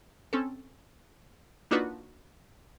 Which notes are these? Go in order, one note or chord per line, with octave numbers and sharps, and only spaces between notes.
C4 C#4 A4
A#3 D4 D#4 F4 F#4 B4